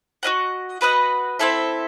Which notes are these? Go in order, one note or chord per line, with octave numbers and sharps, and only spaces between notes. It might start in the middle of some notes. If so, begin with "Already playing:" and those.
F#4 B4 D#5 F#5
F#4 B4 D#5 F#5
C4 E4 A4 E5